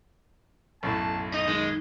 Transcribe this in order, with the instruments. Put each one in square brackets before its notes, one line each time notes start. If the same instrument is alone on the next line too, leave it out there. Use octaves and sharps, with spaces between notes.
[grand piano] B1 F#2 A2 [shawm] A5
[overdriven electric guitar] D#4 [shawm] D#5
[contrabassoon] D#3 [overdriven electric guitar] G#3